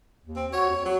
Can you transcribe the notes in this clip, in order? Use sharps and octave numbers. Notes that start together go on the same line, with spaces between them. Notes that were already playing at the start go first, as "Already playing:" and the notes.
D#2
C4
F#4 C#5
F2
F#3